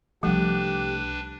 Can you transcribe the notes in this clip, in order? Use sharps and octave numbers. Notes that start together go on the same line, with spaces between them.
C2 F3 G3 A3 D4 G4 B4